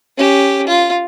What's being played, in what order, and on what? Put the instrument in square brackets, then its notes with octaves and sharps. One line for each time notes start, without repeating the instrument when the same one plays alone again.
[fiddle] C#4 G4
F4